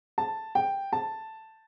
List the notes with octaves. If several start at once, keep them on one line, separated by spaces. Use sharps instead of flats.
A5
G5
A5